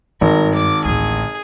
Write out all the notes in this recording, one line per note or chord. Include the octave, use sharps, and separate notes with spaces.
G#1 G2 A#4
D6
A1 D2 G#4